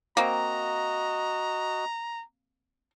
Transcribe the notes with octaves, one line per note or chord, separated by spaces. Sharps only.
A#3 C4 F#4 D#5 A#5